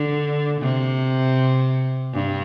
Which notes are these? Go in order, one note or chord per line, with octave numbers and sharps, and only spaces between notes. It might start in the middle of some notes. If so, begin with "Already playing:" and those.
Already playing: D3
C3
G2